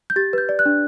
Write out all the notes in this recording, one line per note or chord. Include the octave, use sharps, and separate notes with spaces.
G6
G4 A6
B4 G6
D5
F#6
D4